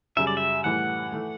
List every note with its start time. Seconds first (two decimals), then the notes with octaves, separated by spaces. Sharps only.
0.17 F#2 C#3 G3 E5
0.27 D5
0.37 E5
0.64 A2 E3 G3 F#5
1.12 E3 A3